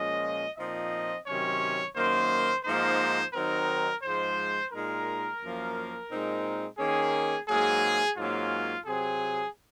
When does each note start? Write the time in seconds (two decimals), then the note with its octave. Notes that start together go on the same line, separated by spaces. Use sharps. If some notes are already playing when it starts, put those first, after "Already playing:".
Already playing: A#2 F3 G#3 C#4 D#5
0.58 A#2 F3 C4 D#4 D#5
1.26 C3 D#3 F#3 C#4 C#5
1.96 F#2 D#3 A#3 C5
2.64 G#2 F3 A#3 D#4 C5
3.34 D#3 F#3 C4 D#4 A#4
4.03 G#2 F3 G#3 C5
4.72 A#2 G#3 D#4 A#4
5.41 F#2 F3 A#3
6.10 A#2 G#3 C4 D#4
6.79 D#3 A#3 C#4 G#4
7.48 G#2 F#3 A#3 G#4
8.17 G#2 F#3 A#3 C#4 F4
8.86 C3 F#3 C4 G#4